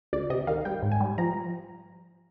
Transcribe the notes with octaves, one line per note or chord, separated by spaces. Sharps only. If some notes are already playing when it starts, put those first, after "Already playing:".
D2 D5
C3 D#5
D#3 F5
G3 G5
G#2
G#5
G3
F3 A#5